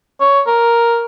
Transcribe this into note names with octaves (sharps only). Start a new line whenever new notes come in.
C#5
A#4